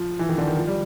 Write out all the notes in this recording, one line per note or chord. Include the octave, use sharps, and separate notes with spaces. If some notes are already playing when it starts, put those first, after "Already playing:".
Already playing: F3
E3
D#3
D3
D#3
F3
G3